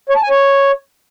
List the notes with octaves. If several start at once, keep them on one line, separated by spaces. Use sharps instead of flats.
C#5
A5
G#5
C#5